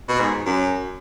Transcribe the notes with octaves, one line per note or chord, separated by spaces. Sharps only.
B2
G#2
F#2